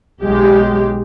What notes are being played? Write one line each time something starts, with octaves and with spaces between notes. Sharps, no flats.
B1 G#3 G4